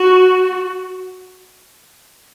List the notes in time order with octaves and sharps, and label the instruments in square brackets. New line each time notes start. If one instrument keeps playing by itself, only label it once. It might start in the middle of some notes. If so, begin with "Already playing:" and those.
Already playing: [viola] F#4